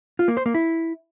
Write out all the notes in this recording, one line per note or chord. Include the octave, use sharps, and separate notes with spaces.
F4
A#3
C5
A#3
E4